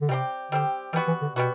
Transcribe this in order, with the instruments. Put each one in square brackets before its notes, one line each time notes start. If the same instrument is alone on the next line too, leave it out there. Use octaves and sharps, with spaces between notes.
[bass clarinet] D3
[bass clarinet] C3 [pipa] G3 C4 G4
[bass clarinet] D3 [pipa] G3 C4 G4
[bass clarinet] E3 [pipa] G3 B3 F#4
[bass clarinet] E3
D3
[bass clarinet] B2 [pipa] G3 B3 F#4